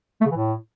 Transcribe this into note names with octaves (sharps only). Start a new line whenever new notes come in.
A3
C#3
E3
A2